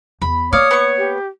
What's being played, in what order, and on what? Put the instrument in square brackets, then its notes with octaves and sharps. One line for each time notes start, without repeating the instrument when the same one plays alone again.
[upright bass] E2 [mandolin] B5
[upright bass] A#3 [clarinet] C#5 [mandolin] D5 F5 [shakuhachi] D#6
[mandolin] B3 C#6
[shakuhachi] G4